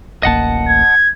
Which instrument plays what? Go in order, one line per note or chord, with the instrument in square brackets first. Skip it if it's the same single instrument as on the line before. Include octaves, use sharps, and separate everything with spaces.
[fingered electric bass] D1 A1 A#3 [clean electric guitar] D#5 F#5 A5
[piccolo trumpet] G#6